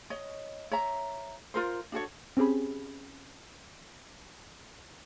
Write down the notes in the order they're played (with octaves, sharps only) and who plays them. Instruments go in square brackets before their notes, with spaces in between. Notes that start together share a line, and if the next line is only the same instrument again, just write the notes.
[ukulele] C#5 D#5
C#5 E5 A#5
F4 A#4 C5
D4 F#4 A4 C#5
[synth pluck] C4 C#4 G4 G#4 B5